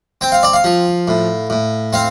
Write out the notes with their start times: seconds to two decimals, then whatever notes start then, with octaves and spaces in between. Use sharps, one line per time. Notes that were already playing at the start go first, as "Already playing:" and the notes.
0.21 C4 G5
0.32 F5
0.43 D5
0.53 F5
0.64 F3
1.08 A2
1.50 A2
1.93 C4 F5